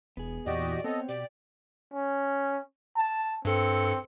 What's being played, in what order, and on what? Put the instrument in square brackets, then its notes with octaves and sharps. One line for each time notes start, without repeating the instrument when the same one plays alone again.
[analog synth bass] E1 [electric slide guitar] B3 G#4
[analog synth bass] E2 [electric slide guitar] A#2 E3 [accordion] F#4 G4 D#5 [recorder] D5
[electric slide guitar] B3 C#5 [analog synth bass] C4 [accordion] A4 D#5
[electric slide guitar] B2 [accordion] G4 [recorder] D5
[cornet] C#4
A5
[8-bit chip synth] G2 A4 C#7 [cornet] C4